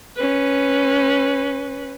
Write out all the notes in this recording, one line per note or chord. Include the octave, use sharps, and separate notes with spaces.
C#4 B4